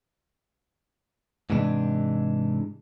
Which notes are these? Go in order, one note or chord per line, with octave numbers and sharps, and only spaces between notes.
G#2 C3 E3 G#3 C#4 D4